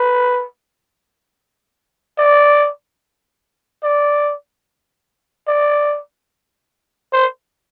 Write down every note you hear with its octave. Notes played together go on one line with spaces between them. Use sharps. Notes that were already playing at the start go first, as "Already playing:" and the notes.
Already playing: B4
D5
D5
D5
C5